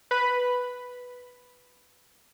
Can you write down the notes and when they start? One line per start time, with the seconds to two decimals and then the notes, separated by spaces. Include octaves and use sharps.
0.11 B4 B5